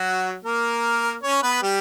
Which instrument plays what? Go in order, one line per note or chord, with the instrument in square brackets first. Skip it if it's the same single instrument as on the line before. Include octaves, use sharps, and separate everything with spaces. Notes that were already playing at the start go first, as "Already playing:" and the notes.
Already playing: [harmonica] F#3 F#4
A#3 A#4
C#4 C#5
B3 B4
G3 G4